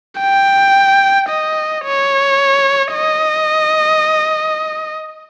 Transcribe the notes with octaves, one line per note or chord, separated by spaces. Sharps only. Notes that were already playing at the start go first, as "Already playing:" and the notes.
G5
D#5
C#5
D#5